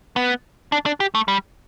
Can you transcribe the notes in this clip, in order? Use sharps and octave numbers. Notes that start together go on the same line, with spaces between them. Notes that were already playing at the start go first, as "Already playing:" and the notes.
B3
D4
D4
G4
A3
G3